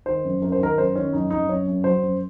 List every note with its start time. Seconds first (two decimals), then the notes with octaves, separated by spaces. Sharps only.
0.06 D#3 C5
0.24 F#2
0.42 F#2 A#4
0.52 C5
0.59 D#3 A#4
0.77 F#2 C5
0.95 D#3 C#4
1.13 F#2 D#4
1.30 F#2 D#4
1.48 F#2 C#5
1.67 F#2
1.84 F#3 C5
2.03 F#2